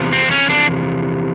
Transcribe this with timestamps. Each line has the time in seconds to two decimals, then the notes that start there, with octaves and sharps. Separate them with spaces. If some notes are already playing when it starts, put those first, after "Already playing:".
Already playing: E2 C3 F3
0.13 C4
0.31 C#4
0.49 D4